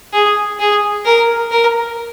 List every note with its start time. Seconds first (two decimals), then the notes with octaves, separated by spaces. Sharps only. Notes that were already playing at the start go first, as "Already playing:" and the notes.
0.13 G#4
0.59 G#4
1.05 A#4
1.51 A#4